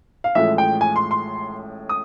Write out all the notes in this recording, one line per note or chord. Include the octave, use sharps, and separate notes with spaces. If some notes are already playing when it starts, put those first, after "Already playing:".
F5
A1 A2 F3 G#3 E5
G5
G#5
C6
C6
D#6